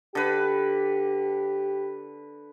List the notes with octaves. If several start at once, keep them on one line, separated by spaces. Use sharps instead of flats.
D3 G4 B4